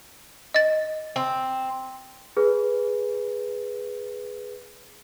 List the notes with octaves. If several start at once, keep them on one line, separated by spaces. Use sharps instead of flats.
D#5 A6
C4
G#4 B4